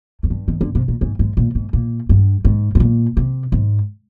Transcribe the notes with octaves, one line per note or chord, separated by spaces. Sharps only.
F2
G2
D#3
D3
C3
A#2
G#2
G#2
A#2
G#2
A#2
G2
G#2
G#2
A#2
C3
G#2